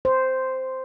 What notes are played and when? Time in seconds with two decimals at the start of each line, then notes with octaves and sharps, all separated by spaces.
0.05 C5